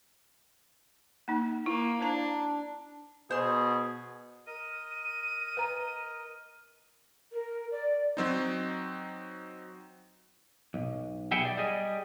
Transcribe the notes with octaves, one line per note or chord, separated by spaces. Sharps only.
A#3 D#4
A#3 E4
D4 C5 F5 A#5
B2 G#4 C5 C6
A#4 D#5 D#7
B4 A#5
A#4
D5
F#3 C4 D#4
B1
G4 G#4 B4 E5 F#5 G5
D5
G3 G#4 D#5